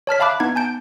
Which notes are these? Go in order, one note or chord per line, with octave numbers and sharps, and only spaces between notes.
C#5 A5 F6 B6
E5 F5 A5 B5 D6 F#6
B3 D#4 G#6
G#5 A5 G6 D7